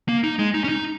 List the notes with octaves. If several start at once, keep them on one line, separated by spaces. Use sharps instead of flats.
A#3
D#4
G#3
D#4
C#4
D#4